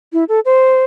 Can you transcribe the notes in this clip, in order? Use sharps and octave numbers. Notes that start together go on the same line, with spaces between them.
E4
A4
C5